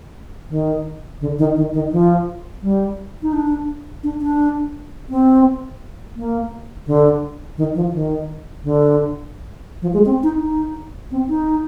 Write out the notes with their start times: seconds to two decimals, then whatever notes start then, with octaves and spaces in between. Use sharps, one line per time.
0.50 D#3
1.21 D3
1.39 D#3
1.56 D#3
1.74 D#3
1.92 F3
2.62 G3
3.22 D#4
3.33 D4
4.04 D4
4.21 D4
5.10 C4
6.16 A#3
6.87 D3
7.57 D#3
7.75 F3
7.93 D#3
8.64 D3
9.82 F3
9.93 G#3
10.06 C4
10.23 D#4
10.40 D#4
11.11 C4
11.29 D#4